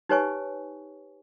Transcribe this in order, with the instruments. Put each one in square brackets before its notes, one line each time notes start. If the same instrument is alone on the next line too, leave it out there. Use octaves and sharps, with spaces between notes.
[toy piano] D#4 G4 B4 C#5 G#5 C#6